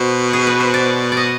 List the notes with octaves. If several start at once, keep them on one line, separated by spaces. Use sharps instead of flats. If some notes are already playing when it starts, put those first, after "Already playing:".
Already playing: B2 C5
G#4
B4
C5
D5
D5
D#5